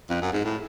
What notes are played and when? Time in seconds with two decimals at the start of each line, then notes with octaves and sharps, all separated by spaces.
0.10 F2
0.22 F#2
0.33 G#2
0.44 A2